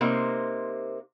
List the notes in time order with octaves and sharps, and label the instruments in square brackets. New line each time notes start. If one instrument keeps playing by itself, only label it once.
[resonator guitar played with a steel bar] C3 A#3 D#4 C5